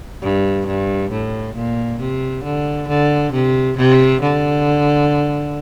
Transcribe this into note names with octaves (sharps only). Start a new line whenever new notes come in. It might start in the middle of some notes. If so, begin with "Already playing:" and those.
G2
G2
A2
A#2
C3
D3
D3
C3
C3
D3